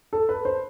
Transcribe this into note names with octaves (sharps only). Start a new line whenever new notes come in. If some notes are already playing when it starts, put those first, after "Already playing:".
A4
B4
C5